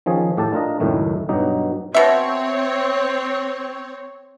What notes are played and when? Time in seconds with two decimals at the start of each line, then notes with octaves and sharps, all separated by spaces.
0.06 D#3 F3 C#4 G#4
0.37 A2 G4 A4 A5
0.53 D4 F4 A#4 D#5
0.80 C#2 F#2 A2 D#3 A3
1.29 G2 B2 F#3 D#4 G4
1.94 B2 C4 C#5 E5